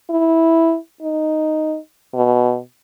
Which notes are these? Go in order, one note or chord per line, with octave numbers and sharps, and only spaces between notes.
E4
D#4
B2